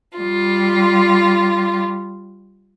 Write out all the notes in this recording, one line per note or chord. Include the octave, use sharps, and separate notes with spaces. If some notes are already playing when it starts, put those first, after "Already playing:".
G3 F4